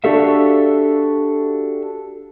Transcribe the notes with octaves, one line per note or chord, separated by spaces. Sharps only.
D4 F#4 G4 A4 E5 F5